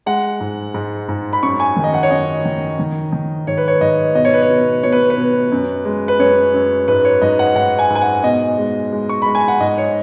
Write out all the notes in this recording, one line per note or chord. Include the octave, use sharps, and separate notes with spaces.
G#3 F#5
G#2
G#2
G#2
B5
F#2 C#6
G#5
D#3
D#5
F#5
C#5
F#2 D#5
D#3
D#3
D#3
G#2 C#5
B4
C#5
G#2 D#5
B2 D#5
C#5
B4
C#5
B2
B2 C#5
B4
B4
B2
F#2
G#3
B4
F#2 C#5
F#2
G#2 B4
C#5
G#2 D#5
F#5
G#2 F#5
G#5
G#2
G#5
F#5
B2 D#5
G#3
G#3
C#6
G#3 B5
G#5
F#5
G#2 D#5
C#5